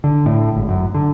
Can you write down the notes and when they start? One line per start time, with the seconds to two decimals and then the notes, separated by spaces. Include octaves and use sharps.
0.04 D3
0.26 A2
0.56 G#1
0.69 F#2
0.94 D3